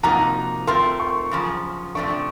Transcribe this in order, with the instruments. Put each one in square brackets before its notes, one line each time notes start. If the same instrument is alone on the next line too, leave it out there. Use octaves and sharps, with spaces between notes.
[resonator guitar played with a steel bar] C3 F3 A#3 D#4 F#4 [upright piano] A#5
[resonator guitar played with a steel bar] A3 C4 F4 A#4 [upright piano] C6
[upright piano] C#6
[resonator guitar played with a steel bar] F#2 C#3 F3
[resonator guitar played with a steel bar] C3 F3 A3 D4 [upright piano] C#6